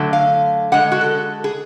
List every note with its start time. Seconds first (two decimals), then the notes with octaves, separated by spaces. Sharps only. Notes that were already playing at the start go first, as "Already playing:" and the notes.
Already playing: D3 F#3 A3
0.13 F5
0.72 D3 G#3 F#5
0.92 F#4
1.01 A4
1.44 G#4